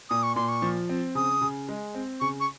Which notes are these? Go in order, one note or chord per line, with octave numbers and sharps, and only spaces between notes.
A#2 D#6
C#6
A#2 C6
C#6
F3
C4
C#3 D#6
C#3
G#3
C4
C#3 C#6
C#6